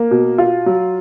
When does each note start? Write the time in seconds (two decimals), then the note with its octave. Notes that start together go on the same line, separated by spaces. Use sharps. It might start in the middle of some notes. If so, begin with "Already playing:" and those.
Already playing: A#3
0.11 B2
0.38 F4
0.66 F#3